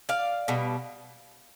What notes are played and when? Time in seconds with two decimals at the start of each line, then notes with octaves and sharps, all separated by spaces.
0.09 D5 F5
0.48 B2 G3